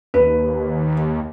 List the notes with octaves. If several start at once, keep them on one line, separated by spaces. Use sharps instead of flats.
D#2 B4